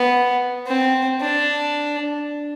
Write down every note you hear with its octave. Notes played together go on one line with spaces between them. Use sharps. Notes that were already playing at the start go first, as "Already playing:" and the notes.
Already playing: B3
C4
D4